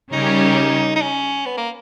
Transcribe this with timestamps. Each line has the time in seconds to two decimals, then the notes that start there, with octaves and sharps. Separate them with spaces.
0.13 C#3 G3 C#4 D#4 G4 A#4
0.96 D#4
1.02 C#4
1.46 B3
1.57 A#3